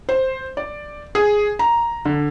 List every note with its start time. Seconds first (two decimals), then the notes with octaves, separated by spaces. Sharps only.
0.09 C5
0.57 D5
1.15 G#4
1.59 A#5
2.05 D3